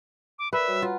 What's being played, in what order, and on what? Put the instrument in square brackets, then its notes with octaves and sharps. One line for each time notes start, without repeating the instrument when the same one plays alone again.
[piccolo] D6
[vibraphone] A#4 D5 [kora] B4 [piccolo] E5
[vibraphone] G3 F#4 C#5
[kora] F4 [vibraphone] F#5 A#5